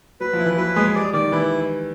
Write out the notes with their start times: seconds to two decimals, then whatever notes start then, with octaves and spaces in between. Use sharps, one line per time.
0.21 F#3 B4
0.33 F3
0.39 E4
0.46 E3
0.57 F#3 B4
0.76 G#3 G#4
0.95 G3 D5
1.13 D#3 D5
1.32 E3 E4